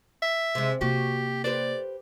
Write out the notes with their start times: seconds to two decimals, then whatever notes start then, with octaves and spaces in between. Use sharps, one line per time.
0.22 E5
0.55 C3 G#3
0.81 C3 A#3 F#4 G4
1.44 G4 B4 C5 D5